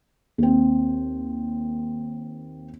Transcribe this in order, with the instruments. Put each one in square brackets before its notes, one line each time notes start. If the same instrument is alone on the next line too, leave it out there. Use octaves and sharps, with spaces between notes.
[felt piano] D#2 C4